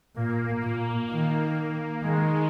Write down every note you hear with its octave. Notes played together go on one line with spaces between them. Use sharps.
A#2 A#3
A#2
D#3
D#3 G#3